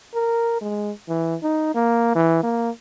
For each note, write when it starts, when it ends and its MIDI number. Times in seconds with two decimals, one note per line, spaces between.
0.14 0.57 70
0.61 0.91 56
1.08 1.35 52
1.43 1.73 63
1.75 2.11 58
2.15 2.43 52
2.43 2.70 58